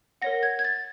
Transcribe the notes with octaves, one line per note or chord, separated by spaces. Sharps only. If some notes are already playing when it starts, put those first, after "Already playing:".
A#4 C#5 F#5 A#6
G#6
G#6
A6